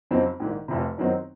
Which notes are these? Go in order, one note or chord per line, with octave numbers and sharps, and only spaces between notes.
F2 C#3 F#3 C4 D#4
A#1 G#2 D#3
F1 F2 C3
F#2 D#3 F#3 C4 D#4